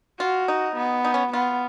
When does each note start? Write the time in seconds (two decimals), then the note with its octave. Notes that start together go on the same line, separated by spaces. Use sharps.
0.20 F4 F#4
0.48 D#4
0.76 B3
1.04 D#4
1.14 C#4
1.33 B3 F4